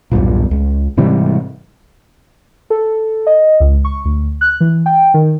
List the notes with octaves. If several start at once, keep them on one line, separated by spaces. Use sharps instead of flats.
B1 E2 G2 A#2
C#2
G#2 C3 E3 G3
A4
D#5
C#2
C#6
D2
F#6
E3
G5
D#3